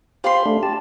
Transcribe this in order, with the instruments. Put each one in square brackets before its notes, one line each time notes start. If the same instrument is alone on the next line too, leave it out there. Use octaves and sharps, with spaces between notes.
[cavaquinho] F4 B5 C6 [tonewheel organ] G4 C5
[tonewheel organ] A3 D4
G4 A5